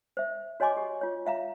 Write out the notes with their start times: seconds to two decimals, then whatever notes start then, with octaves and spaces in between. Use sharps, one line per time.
0.17 C5 E5
0.60 F#4 C#5 D#5 G#5 C6 D6
0.77 G4
1.01 F4 C#5
1.26 F4 E5 F5 A#5